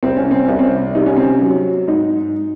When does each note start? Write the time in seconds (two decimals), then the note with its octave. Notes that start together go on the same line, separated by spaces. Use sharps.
0.03 C2 C4
0.17 C#4
0.31 C4
0.44 C2 C#4
0.59 C4
0.95 C3 D#4
1.06 C#4
1.16 C4
1.27 C#4
1.42 F#3
1.87 G#2 D#4